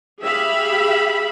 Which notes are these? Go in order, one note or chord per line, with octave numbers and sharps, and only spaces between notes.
G4 G#4 E5 F5 B5